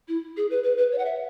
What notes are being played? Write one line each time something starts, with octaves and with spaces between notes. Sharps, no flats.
E4
G#4
B4
B4
B4
C#5
F#5
E5